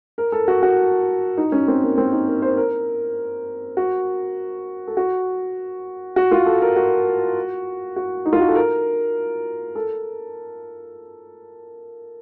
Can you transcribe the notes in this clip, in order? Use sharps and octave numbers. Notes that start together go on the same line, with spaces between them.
A#4
A4
F#4
F#4
D#4
C#4
C4
A#3
C4
D#4
A#4
C5
A#4
F#4
A4
F#4
F#4
F4
A4
A#4
F#4
F#4
D#4
F4
F#4
A4
A#4
A4